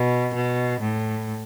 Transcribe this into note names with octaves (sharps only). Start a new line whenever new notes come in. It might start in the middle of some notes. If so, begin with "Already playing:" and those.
Already playing: B2
B2
A2